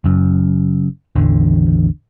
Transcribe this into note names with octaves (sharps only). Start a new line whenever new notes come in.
F#1 F#2
A1 E2 D3